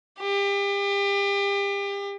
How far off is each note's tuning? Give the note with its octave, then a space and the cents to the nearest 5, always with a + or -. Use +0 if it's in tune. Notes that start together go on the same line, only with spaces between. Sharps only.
G4 +35